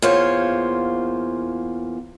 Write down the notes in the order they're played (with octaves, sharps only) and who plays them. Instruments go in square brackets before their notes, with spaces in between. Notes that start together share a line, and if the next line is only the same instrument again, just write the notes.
[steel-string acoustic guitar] E2 A#3 F4 C5 C#5